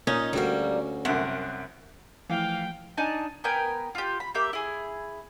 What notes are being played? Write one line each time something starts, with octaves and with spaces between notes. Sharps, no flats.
A#2 C#4 D#4
D2 G3 A#3 F#4
C2 F#2 F#5
E3 F3 A3 F5 G5
D4 D#4 G#5 A5
B3 A#4 G5 G#5
F4 G4
B5
A#3 G4 E5
E4 G#4